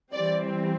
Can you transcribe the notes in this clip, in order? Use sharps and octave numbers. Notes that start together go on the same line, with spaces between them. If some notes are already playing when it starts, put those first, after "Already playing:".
E3 G3 C4 D5